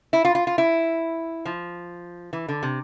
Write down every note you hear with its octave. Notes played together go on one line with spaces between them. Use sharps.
E4
F4
F4
F4
E4
F3
E3
D3
C3